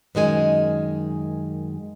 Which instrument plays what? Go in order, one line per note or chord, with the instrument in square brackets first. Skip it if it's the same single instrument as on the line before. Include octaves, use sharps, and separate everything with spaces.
[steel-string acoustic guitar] F#2 D#3 G#3 G#5